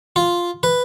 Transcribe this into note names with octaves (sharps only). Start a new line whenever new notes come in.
F4
B4